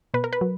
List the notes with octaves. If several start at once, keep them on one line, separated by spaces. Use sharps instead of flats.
B2 B4
A#4
B4
F#3